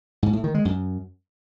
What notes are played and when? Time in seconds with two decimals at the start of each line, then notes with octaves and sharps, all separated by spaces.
0.23 G#2
0.33 A2
0.44 D#3
0.54 G#3
0.65 F#2